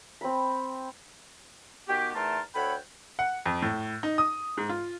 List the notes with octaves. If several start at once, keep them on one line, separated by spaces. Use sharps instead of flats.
C4 B5
D#3 B3 F#4 G4
E2 A3 D#4 A#4 A5 C6
D2 A4 C#5 F#5 G5 B5
F#5
F2
A2
D#4
D#6
G#2
F4